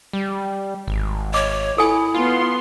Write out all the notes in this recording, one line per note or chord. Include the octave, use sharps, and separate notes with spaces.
G3
G#1
C#5 D#5 D6
E4 A4 G#5
B3 F4 C6